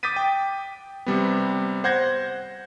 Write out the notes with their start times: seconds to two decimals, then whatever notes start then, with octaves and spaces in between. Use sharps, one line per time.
0.03 D6 D#6 G6 A6 B6 D#7
0.16 G5
1.06 C3 G3 B3
1.84 C5 F#5 G6 G#6 A#6